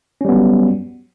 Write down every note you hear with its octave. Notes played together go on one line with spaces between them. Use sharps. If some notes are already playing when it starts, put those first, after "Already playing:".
F#3 G3 B3 C#4